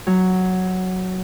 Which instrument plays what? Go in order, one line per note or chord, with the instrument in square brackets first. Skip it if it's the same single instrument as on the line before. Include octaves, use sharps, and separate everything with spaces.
[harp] F#3